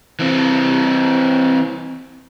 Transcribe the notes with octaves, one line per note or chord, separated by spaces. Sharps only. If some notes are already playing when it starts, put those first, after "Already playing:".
E3 C4